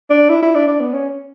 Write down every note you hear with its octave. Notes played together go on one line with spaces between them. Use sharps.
D4
E4
E4
D4
D4
B3
C#4